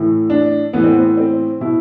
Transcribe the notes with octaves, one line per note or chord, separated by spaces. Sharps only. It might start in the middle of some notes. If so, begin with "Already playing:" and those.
Already playing: A2 E3
D4
A2 E3 B3
C4
B3
C4
B2 E4